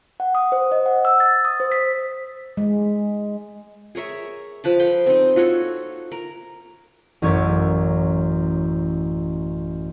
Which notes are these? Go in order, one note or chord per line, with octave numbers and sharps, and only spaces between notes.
F#5
D#6
C5
D#5
F#5
E6
A6
D#6
C5
B6
G#3
G#4 A#4 C#5 E5
F3 B4 A5
A4 F5 G5 B5
C4 D#4
F4 F#4 A4 C#5
A#4
A1 F#2 C#5 E5 D6